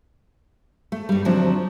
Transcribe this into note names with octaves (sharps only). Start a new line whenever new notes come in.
A3
G2 G3
D2 F3 F#3 A3 C4 D4